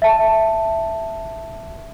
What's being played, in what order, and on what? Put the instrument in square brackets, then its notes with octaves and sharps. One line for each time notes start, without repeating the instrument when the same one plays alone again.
[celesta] E5 A5